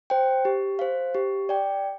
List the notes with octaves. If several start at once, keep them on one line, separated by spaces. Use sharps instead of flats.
C5 G5
G4
C5 F5
G4
D5 G5